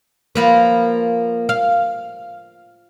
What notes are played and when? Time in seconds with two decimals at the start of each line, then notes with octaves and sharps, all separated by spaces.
0.35 F3 A#3 B4
1.49 F5